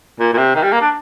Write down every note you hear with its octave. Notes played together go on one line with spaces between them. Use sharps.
A#2
A#2
C3
D#3
G3
A#3
D4